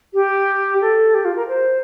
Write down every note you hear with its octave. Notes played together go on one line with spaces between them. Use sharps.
G4
A4
G4
F4
A#4
C5